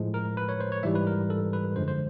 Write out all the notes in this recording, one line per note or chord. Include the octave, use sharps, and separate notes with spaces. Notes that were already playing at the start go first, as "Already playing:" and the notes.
Already playing: A2 F3 G#3
A#4
B4
C#5
C5
C#5
G#2 E3 G3 E5
B4
A#4
A4
B4
F#2 D3 F3 G#3 C5
C5